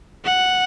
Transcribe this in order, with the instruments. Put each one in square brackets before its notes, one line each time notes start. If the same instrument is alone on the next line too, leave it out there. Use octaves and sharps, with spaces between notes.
[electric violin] F#5